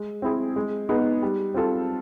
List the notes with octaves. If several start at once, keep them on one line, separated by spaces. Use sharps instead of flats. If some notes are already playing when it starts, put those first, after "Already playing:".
Already playing: G#3
C4 E4 G#4
G#3
B3 D#4 G#4
G3
C4 F4 A4